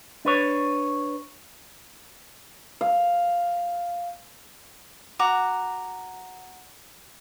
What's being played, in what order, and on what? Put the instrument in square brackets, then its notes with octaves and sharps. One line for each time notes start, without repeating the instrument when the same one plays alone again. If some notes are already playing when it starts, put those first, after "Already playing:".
[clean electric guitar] D4 B4 C#5
[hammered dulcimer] F5
[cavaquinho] F#4 A#5 D6